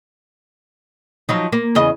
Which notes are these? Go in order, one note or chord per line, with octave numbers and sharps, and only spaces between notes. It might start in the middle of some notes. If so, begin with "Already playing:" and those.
F3 F#3 D#4
A#3
E2 C#3 D#5